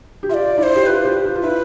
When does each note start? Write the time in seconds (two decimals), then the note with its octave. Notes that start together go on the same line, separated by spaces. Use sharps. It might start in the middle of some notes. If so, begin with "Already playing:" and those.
0.23 G4
0.29 F4 E5
0.34 D5
0.58 E4 D5
0.63 C5
0.75 G4
0.86 F4 B4
1.05 G4
1.25 F4
1.35 F4
1.43 E4 B4